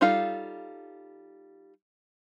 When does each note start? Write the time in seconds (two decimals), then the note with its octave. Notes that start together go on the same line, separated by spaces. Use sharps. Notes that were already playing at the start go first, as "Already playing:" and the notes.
0.01 G3 D#4 F4 A4 F5